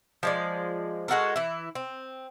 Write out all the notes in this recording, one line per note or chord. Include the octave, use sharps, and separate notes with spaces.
F3 G#3 D5
G#3 F#4 A4 A#4
E3 E4
C4